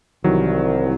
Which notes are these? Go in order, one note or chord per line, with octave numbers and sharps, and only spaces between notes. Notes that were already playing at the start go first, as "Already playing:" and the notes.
C2 D#3 E3 F#3